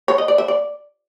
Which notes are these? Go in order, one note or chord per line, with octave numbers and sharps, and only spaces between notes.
C#5
D#5
D5
E5
D5